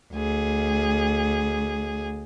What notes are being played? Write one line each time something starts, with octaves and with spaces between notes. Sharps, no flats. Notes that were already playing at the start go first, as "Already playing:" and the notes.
D2 G#4